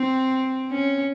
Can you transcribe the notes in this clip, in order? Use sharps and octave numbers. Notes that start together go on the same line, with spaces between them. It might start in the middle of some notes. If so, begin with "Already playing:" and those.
Already playing: C4
C#4